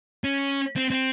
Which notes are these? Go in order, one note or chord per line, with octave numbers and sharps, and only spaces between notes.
C#4
C4
C4